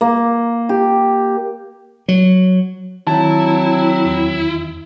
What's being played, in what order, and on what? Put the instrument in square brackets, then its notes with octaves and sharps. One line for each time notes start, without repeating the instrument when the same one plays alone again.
[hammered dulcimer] A#3
G4
[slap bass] F#3
[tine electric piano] D#3 [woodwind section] F#3 C4 [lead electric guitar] E4 [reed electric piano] A5
[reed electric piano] E2